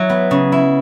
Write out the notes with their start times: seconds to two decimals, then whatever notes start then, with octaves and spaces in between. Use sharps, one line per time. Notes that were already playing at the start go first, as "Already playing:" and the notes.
Already playing: F#3 E4
0.10 B3
0.31 C#3
0.52 E4